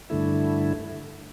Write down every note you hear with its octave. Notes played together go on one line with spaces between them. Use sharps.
G2 D3 A3 E4